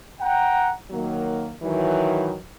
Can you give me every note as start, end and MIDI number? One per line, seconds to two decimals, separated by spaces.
0.21 0.72 78
0.21 0.72 79
0.21 0.72 82
0.91 1.51 51
0.91 1.51 54
0.91 1.51 58
1.62 2.35 51
1.62 2.35 52
1.62 2.35 54